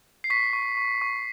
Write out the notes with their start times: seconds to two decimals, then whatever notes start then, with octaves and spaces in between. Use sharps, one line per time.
0.24 C7
0.30 C#6 B6
0.53 C#6
0.77 C#6
1.02 C#6